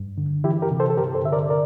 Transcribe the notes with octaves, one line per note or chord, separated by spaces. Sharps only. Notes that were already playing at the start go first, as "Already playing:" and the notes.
Already playing: G2
D3
E3 E4 G4
G4 A#4
C3
A4 C5
A4
G2 G4 A#4
A4 C5
D3 E5
A#4 D5
A#4 D5